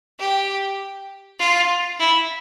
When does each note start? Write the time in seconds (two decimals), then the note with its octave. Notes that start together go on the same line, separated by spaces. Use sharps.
0.19 G4
1.40 F4
1.99 E4